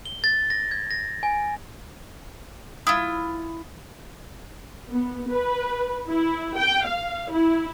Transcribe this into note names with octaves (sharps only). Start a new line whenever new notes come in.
G7
A6
A#6
G#6
A#6
G#5
E4 F4 D#6
B3
B4
E4
G5
F5
E4